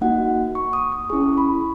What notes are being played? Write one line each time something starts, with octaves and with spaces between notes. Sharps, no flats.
A#3 D#4 F#4 F#5
C#6
D#6
D#6
C#4 E4 G#4 C#6
B5